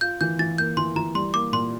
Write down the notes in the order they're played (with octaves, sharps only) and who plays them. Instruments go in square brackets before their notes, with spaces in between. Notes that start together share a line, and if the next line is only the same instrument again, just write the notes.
[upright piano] F4 [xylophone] G6
[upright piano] E3 [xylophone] G6
[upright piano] E3 [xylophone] A6
[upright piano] A#3 [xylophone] G6
[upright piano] E3 [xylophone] C6
[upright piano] E3 [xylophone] A#5
[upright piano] G3 [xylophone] C6
[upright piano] A#3 [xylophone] D6
[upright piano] A#2 [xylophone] C6